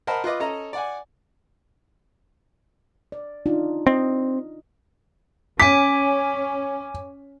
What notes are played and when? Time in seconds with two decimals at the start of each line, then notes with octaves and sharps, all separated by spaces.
0.07 A#4 C5 D#5 F#5 A5 B5
0.24 F4 B4 D#5 D6
0.40 C#4 A4 D#5 A#5
0.73 D5 F#5 G#5
3.12 D5
3.46 D4 D#4 F4
3.87 C4 D#5
5.60 C#4 G#5 D6 B6